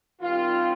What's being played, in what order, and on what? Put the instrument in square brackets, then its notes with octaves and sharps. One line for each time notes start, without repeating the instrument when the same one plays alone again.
[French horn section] D#3 G3 C4 F4